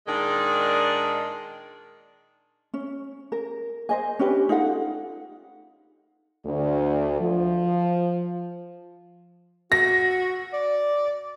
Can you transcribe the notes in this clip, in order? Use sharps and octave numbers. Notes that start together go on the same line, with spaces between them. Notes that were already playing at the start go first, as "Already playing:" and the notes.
A#2 D#3 G#3 D4 A#4
C#4
A#4
C5 D#5 G#5
C#4 D4 G4 B4
D#4 F4 A4 F#5
D2
F3
F#4 A#6
D5